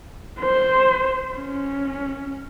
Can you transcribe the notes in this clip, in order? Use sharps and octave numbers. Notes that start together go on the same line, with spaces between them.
C5
C#4